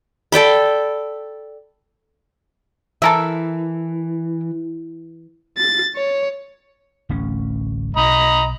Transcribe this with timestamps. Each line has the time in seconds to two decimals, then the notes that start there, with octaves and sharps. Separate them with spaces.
0.32 A4 D5 G5 B5
3.02 E3 A4 A#4 E5
5.57 A6
5.96 C#5
7.09 D1 A1 C#4
7.96 B1 D#5 A#5 B5